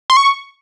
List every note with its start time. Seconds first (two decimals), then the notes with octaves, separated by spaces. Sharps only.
0.10 C6
0.17 C#6